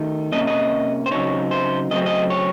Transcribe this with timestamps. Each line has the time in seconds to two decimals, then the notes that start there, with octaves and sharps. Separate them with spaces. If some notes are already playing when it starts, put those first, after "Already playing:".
Already playing: D#3 A3 D#4
0.32 C3 F3 A#3 C#4 D#5
0.47 D#5
1.06 C5
1.11 C#3 F#3 C4 D#4 C#5
1.51 C5
1.91 C#3 F#3 A3 C4 D#5
2.06 D#5
2.30 C#5